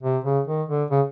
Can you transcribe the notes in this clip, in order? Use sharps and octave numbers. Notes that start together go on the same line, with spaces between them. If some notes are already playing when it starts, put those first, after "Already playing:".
C3
C#3
D#3
D3
C#3